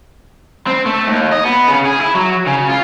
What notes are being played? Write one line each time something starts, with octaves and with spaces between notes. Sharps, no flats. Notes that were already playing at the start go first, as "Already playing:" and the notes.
C4
A3
D#2
D#5
B3
C#3
G#4
E4
F#3
C#3
F4